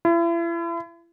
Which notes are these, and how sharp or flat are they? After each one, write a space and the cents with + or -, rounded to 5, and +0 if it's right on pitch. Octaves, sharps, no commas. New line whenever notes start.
E4 +40